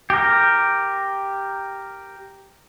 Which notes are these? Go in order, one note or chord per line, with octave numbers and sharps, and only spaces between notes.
G4 A#4